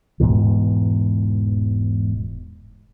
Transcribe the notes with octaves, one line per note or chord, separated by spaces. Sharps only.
E1 G#2 B2 E3